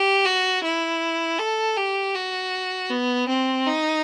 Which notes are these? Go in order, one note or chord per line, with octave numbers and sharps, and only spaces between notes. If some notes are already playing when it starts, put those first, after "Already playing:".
Already playing: G4
F#4
E4
A4
G4
F#4
B3
C4
D#4